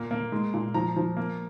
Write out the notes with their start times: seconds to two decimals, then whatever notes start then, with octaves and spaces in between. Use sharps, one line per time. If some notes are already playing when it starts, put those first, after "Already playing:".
Already playing: A#2 A#3
0.11 A#3
0.32 G#3
0.54 A#2
0.74 F3 A#5
0.96 F3
1.17 A#3